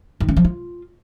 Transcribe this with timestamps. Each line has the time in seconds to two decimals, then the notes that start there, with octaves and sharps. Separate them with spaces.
0.20 D#3
0.29 C#4
0.37 F3
0.45 F4